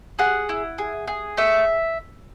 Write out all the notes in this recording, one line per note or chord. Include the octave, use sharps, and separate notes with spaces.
G#4 F#5
E4
G#4
G#4
A3 E5